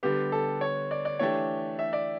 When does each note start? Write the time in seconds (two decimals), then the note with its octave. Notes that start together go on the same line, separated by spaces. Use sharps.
0.03 D3 G3 B3 G4
0.32 A4
0.61 C#5
0.91 D5
1.05 D5
1.19 E3 A3 D4 G4 C#5
1.79 E5
1.93 D5